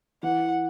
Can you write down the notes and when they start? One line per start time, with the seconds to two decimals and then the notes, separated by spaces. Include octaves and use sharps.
0.23 E3 F#5